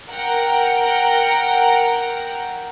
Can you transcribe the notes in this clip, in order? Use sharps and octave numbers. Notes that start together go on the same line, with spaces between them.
A#4 F#5 G5 A#5